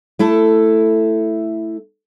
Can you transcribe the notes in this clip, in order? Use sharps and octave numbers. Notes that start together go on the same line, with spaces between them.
A3 E4 A4